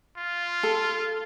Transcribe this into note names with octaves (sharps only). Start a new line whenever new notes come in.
F4
A4